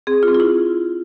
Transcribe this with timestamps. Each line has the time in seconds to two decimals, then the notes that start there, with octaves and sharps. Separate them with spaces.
0.07 C4 G#4
0.23 F4
0.28 C4
0.34 F4
0.40 E4